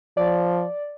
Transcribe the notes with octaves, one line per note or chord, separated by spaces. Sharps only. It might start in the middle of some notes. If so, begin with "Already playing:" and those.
F3 D5